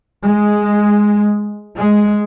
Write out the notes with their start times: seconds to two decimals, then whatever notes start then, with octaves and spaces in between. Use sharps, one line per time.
0.24 G#3
1.77 G#3